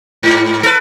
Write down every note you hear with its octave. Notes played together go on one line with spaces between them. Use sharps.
G#2
A4 B4